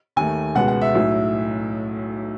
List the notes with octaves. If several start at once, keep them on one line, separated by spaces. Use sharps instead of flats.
D#2 D#3 A3 G#5
C#2 B2 G#3 B3 F#5
F#5
E5
B1 A2 F#3